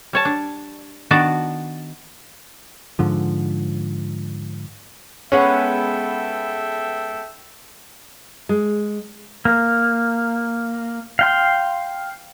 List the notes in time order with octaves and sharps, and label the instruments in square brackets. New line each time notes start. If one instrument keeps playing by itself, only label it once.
[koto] G3 C#5 A5
D4
D#3 B3 D4 F#4 D5 A5
[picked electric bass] G#2 D3 F3
[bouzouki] G#3 B3 F#5 [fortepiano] C#4 [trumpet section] A4 E5 G5
[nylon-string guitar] G#3
[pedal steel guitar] A#3
F5 G5 C6